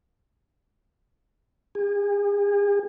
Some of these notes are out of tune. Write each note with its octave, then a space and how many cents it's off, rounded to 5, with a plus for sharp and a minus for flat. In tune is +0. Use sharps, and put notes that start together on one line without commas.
G#4 -40